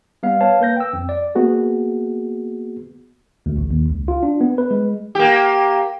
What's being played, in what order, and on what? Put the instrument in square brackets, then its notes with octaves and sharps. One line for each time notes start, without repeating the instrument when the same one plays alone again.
[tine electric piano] G3 B3 F5
B4 C#5 F5 A5
A#3 B4 G6 A#6
G5 E6
F2
D5
[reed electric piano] A#3 B3 F#4 G#4
[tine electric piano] D2
A1
D#2
C#2
F4
D4
B3
B4
G#3
[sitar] A#3 G4